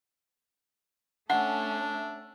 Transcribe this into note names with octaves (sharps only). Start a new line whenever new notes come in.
A3 C#4 D4 A4 E5 F#5